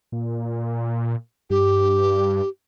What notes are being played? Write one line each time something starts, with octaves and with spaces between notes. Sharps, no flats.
A#2
G2 G4